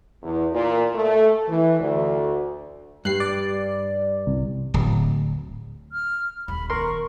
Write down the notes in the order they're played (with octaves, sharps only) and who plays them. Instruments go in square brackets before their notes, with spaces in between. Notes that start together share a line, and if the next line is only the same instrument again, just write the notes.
[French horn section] E2
A#2
A3
E3
D2
[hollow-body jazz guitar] G2 [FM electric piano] F#6 C7
[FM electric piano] D5
C2
[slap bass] D1
[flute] F6
[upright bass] D#1 D2 [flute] B5
[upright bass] D#3 B3 [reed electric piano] A#4 C6 [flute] C#6